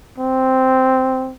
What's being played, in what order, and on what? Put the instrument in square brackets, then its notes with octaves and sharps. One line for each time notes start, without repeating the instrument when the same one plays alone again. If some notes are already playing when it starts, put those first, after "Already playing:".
[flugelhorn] C4